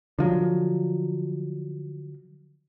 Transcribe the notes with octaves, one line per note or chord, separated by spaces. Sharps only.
D3 F3 F#3